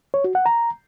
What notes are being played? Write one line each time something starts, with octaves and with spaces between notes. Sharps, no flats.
C#5
F#4
F#5
A#5